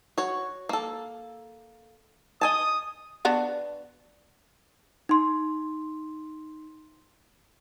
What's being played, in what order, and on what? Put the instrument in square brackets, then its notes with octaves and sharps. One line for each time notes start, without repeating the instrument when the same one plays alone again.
[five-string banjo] F#4 C#5
A#3 A4
[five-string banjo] D#5 G#5 A5 [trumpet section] D#6
[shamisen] B3 D4 F#4
[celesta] D#4 C6